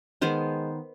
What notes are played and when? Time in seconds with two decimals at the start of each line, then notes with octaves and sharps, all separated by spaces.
0.21 D#3 G#3 B3 C5